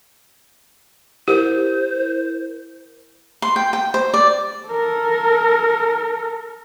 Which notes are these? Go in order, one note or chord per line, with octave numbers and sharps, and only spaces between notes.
E4 G4 A#4 C5
C6
G5
G5
C5
D5
A4 A#4